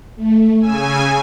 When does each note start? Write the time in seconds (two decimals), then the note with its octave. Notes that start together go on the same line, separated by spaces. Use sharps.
0.16 A3
0.60 C#3 G#5 E6